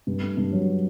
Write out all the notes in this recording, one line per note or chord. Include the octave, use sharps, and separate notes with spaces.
G2
A3
G2
F#3